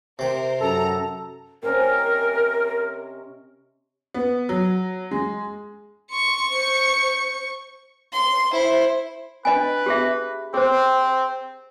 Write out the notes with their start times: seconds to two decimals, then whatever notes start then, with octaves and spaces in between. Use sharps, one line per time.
0.19 C3 A#4 C5 G5
0.61 F#2 A4 A#5
1.63 C3 C#4 A#4 D#5
4.14 B3
4.49 F#3
5.11 G#3
6.11 C6 C#6 C#7
6.50 C5
8.12 C6
8.51 E4 C5
9.45 D4 B4 D#5 G#5
9.86 G4 G#4 E5
10.54 C4 G#4 C5